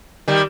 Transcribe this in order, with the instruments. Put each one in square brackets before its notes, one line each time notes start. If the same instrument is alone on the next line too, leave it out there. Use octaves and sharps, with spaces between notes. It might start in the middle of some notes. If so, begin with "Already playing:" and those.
[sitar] D#3 G3